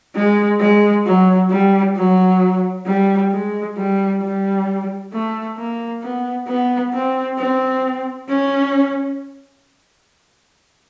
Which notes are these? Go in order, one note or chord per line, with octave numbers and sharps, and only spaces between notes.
G#3
G#3
F#3
G3
F#3
G3
G#3
G3
G3
A3
A#3
B3
B3
C4
C4
C#4